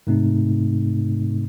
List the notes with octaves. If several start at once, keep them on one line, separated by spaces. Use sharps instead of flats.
G#2 C3 A3 C4 D#4